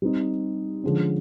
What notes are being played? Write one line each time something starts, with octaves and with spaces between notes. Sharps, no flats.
G3 C4 D#4
D3 F3 G#3 C#4